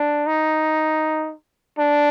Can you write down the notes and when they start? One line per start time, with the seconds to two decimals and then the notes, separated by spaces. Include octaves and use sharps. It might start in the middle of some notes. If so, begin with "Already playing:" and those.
Already playing: D4
0.27 D#4
1.79 D4